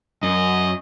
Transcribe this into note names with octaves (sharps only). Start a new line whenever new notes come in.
F#2 D#5